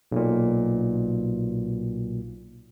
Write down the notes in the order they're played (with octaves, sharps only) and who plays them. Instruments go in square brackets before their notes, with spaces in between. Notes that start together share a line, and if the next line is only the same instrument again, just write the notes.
[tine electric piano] B1 A#2